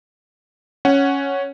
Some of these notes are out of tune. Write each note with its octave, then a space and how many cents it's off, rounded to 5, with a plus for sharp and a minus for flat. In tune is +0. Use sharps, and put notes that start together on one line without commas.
C#4 +0 F#5 +10